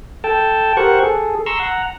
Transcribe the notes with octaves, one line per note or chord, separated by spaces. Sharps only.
A4 G5 A5
G4 A#4 C5 F#5 C#6
G#4 A4
A#5 C6 C#6 E6
F#5 A#5